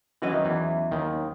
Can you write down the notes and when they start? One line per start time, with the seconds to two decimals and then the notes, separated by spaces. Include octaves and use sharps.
0.22 E3 F#3 C#4 F#4 B4 D#5
0.33 D#3
0.45 E2 E3
0.91 D#2 D#3